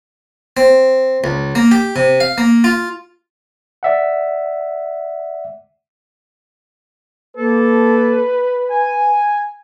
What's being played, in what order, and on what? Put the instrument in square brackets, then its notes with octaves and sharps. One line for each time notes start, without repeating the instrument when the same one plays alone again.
[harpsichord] C4
C#2
A#3
G4
C3
F5
A#3
F4
[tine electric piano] D5 E5 F#5
[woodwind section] A#3 A4 [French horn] B4
[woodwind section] G#5